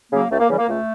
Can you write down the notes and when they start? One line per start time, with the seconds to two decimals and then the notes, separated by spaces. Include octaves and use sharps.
0.12 C#3 F#3 A#3
0.31 C#2 A3
0.40 A#3
0.49 C#3 E3 G3
0.58 A#3
0.68 C#2 A3